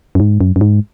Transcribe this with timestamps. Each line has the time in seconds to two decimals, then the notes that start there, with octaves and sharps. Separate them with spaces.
0.15 F#2
0.20 G#2
0.41 F#2
0.56 F#2
0.61 G#2